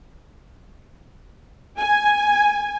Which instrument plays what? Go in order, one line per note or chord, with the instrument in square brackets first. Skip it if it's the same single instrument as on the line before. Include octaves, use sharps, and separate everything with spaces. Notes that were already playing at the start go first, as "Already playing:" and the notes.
[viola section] G#5